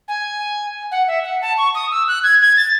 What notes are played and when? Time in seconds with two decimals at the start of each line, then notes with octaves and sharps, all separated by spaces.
0.08 G#5
0.92 F#5
1.08 E5
1.24 F#5
1.42 A5
1.58 C#6
1.75 D#6
1.92 E6
2.08 F#6
2.24 G#6
2.41 G#6
2.57 A6